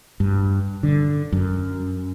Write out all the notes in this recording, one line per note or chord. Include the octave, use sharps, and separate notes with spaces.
G2
D3
F#2